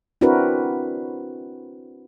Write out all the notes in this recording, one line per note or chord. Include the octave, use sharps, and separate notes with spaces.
C4 D4 E4 F#4 A#4 B4